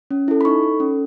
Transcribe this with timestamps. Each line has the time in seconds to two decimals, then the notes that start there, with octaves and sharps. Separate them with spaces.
0.11 C#4
0.28 E4 A4
0.41 B5
0.45 D#4 C#6
0.63 A4
0.80 C#4